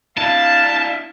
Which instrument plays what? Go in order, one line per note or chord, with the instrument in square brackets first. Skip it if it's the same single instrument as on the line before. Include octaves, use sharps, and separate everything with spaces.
[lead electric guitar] D4 E4 [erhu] F5 [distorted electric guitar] A5 [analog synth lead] A6